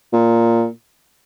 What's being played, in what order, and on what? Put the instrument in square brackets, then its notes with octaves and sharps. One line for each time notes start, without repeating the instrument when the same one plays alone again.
[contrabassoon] A#2